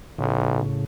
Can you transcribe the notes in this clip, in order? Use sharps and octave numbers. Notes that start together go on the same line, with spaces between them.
B1 A2 C#3